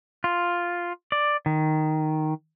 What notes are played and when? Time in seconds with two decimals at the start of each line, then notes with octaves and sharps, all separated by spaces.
0.24 F4
1.12 D5
1.46 D#3